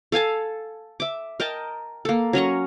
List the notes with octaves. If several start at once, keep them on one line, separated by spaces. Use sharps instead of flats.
A4 F5 G#5 A5
E5 D6
A#4 D#5 G5 A5
A#3 A4
F#3 C#4 A#5 C#6